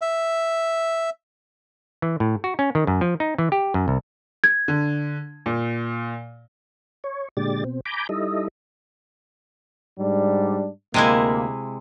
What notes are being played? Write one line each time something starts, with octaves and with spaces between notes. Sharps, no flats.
E5
E3
A2
F#4
C#4
D#3
F#2
F3
D#4
E3
G4
F#2
C2
G#6
D3
A#2
C#5
A#2 D3 G#3 G4 D5 A6
B2 C4
G#5 A#5 B5 D6 G6
G3 D#4 E4 A4 D#5
G#2 G3 D4
D2 C3 G#3 A#3 E4